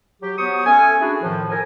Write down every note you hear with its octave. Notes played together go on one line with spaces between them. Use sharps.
F#3 G4
F#3 B3 G4 C5 C#6 D#6
A3 C#4 A4 G#5
A3 D4 E4 F#4 G#4
F2 A2 D#3 F3
A4 A#4 C5 G#5